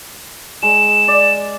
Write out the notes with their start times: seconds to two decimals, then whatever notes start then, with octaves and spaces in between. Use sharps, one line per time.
0.63 G#3 E7
1.08 D5